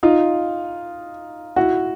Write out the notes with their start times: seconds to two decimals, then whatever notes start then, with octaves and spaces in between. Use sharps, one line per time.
0.03 D#4 F4
1.56 E4 F#4